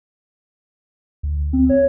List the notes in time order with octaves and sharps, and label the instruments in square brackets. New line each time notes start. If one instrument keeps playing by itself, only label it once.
[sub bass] D2
[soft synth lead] C4
C#5